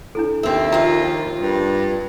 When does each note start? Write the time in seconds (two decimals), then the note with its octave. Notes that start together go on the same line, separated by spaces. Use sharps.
0.15 D4 E4 A4
0.43 D#2 C4 E5
0.72 F2 F4 A#5
1.41 G2